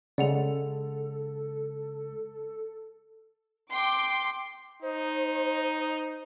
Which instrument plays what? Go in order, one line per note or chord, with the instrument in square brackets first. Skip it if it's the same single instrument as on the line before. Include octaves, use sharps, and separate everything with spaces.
[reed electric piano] C#3 G#3 [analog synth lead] A4 [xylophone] D5 F#5 F7
[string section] G5 C6 D6
[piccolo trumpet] D#4 [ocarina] C5